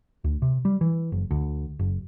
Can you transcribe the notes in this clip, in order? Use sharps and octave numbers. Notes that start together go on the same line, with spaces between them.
D2
C3
G3
E3
F#1
D2
F#1